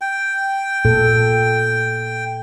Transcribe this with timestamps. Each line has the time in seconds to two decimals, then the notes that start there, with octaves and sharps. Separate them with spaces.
0.01 G5
0.85 A#2 A4